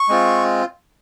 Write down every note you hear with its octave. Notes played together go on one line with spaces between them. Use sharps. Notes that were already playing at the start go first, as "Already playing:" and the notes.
Already playing: C#6
G#3 C4 F4